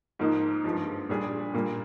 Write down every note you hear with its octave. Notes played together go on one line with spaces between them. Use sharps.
G#2 F3 A#3 D#4
G2 F3 G#3
A#2 G3 D4 G#4
A#2 G3 A#3